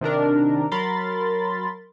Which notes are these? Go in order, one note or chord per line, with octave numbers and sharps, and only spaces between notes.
C3 D#3 D4 A#4
F#3 A#4 B5 C6 A6